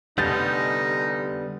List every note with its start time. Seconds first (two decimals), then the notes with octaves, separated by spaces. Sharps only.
0.18 F1 D3 G3 B3 D#4 G6 A6